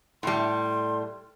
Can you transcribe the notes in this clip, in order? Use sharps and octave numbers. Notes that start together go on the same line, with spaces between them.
A2 G3 C6